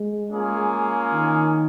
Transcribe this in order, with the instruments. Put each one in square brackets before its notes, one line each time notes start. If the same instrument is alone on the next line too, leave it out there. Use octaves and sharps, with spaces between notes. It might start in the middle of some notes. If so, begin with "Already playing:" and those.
Already playing: [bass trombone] G#3
[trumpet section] A#3 C#4 F4 G#4
[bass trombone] D#3